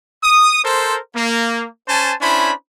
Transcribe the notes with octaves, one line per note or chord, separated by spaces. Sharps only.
D#6
A4 A#4 C5
A#3
C#4 C5 G#5 A5
C#4 D4 E4 C5 B5